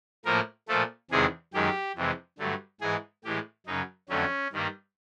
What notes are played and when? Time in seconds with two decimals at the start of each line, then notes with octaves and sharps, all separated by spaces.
0.25 A2 F3 A#3 A#4
0.68 A#2 F3 A3 A4
1.11 E2 C3 D#3 G#3 G#4
1.53 F#2 D#3 G#3 G4
1.96 F2 C3 E3 G#3
2.38 G2 D3 F#3 A3
2.81 G#2 E3 G#3 G#4
3.24 A2 E3 G#3 G4
3.66 F#2 C#3 F#3 D#4
4.09 F2 D3 F#3 A3 C#4
4.52 G2 D#3 G3 A#3